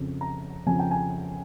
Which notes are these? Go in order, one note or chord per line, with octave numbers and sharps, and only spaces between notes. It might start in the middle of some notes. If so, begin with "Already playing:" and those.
Already playing: F2 C#3 F3
A#5
F2 C#3 F3 G#5
G5
G#5